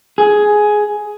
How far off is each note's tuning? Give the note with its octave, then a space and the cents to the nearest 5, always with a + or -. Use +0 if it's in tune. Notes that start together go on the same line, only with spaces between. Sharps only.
G#4 +10